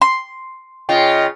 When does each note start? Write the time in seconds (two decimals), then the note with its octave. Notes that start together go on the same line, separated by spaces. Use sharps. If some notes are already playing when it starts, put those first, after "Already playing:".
0.02 C6
0.89 C#3 F4 D#5 G5